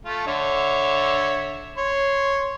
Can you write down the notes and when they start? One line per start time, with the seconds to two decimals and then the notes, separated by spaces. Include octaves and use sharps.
0.05 A3 F4
0.27 D3 C#5 E5
1.77 C#5 C6